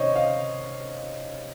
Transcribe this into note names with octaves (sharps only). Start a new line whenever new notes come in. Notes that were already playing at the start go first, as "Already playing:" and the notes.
Already playing: C3 D#3 C#4 C5 C#5 D#5
D#5 F5